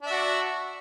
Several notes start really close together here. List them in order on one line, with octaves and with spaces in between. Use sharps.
D4 E5 F#4